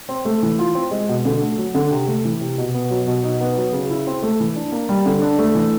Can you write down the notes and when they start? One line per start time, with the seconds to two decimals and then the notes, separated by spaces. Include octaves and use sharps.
0.09 C4
0.25 A3
0.43 E3
0.59 F4
0.75 C4
0.91 G#3
1.08 B2
1.25 D3
1.42 A3
1.58 F#3
1.75 D3
1.91 C3
2.07 A3
2.25 E3
2.41 C3
2.58 B2
2.74 B3
2.91 F#3
3.07 B2
3.23 D#4
3.41 B3
3.57 F#3
3.73 C#3
3.90 E4
4.07 C4
4.23 A3
4.40 E3
4.56 D4
4.72 A#3
4.89 G3
5.06 D3
5.22 D4
5.39 A3
5.55 E3